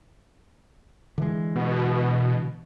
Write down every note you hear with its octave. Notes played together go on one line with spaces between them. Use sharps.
D3 E3 G#3
B2